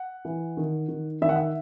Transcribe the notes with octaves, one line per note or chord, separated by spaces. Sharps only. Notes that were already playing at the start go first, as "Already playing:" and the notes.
Already playing: F#5
E3
D#3
D#3
D#3 E5
F#5
E5